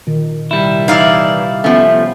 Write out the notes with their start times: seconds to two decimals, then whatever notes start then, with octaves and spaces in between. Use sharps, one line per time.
0.07 A#2 D#3
0.51 C2 G3 E4
0.88 E3 D#4 D5 F5
1.64 F3 A3 B3 C#4